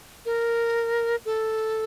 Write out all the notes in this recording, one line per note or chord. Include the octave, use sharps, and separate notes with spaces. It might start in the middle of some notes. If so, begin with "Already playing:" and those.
A#4
A4